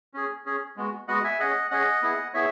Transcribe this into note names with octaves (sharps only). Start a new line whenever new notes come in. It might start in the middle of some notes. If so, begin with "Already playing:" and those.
C#4 G#4
C#4 G#4
G#3 B3 F#4
G#3 B3 F#4 D#5 F#5
E5 G#5
C#4 G#4 D#5 F#5
C#4 G#4 D#5 F#5
B3 E4 G#4
B3 E4 G#4 C#5 E5